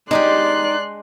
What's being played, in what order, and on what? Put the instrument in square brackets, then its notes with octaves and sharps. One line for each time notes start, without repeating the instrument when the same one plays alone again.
[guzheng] G#3 D4 G4 [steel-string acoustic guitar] D#4 [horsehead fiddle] D5 [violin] C6 F#6